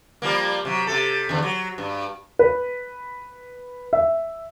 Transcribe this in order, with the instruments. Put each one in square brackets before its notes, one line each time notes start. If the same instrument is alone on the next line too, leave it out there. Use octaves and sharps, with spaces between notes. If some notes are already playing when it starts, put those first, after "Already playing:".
[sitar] F3 G3 A#3
C3 F#3
C3 A4
E2 D3
F#3
G2
[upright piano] B4
E5